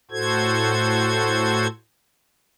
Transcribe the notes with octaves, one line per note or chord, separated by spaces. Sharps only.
A2 F#4 A4 C5 G#6